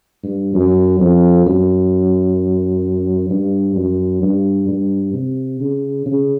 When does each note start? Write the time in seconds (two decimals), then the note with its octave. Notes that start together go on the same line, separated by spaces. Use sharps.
0.23 G2
0.54 F#2
1.00 F2
1.46 F#2
3.30 G2
3.76 F#2
4.22 G2
4.68 G2
5.14 C3
5.60 C#3
6.06 C#3